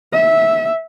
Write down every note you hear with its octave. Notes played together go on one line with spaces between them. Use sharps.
E5